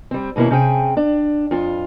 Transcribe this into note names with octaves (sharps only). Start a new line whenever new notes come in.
G3 C4
D#2 B2 A#3 C#4 E4
C3 C#4 G#4 G5
D4
F2 F4